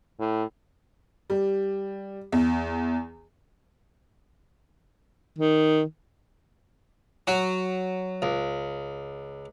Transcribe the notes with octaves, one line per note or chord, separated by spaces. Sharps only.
A2
G3
E2
D#3
F#3 F#4
C#2